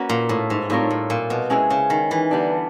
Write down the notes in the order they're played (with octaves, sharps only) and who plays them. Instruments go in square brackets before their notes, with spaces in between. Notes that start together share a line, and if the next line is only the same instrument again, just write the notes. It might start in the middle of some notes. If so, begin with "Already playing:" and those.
Already playing: [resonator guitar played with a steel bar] A#3 C#4 F#4 B4
[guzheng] A#2
A2
G#2
[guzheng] A2 [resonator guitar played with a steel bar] G3 C4 F4 A#4 C#5
[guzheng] A2
A#2
B2
[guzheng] C3 [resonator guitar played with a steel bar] G#3 C#4 E4 G#4
[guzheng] C#3
D#3
E3
[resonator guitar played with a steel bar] D3 G3 B3 D4